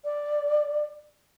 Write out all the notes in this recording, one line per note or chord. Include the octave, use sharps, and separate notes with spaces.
D5